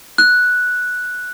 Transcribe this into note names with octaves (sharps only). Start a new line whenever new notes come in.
F#6